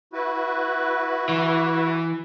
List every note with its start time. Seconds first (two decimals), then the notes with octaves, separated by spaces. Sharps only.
0.13 E4 F#4 B4
1.29 E3